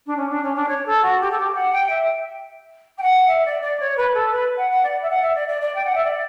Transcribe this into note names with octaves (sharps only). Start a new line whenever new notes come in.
D4
C#4
D4
C#4
D4
C#5
A4
F#4
G4
A4
G4
F#5
G5
E5
G5
F#5
E5
D5
D5
C#5
B4
A4
B4
F#5
F#5
D5
E5
F#5
E5
D5
D5
D5
G5
F#5
E5
D5